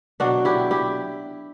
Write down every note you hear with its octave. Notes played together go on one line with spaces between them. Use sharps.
B2 F#3 D4 F#4
E4 G4
E4 G4